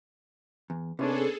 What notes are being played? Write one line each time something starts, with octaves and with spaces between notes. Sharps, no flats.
E2
C3 B3 C#4 D4 G#4 A4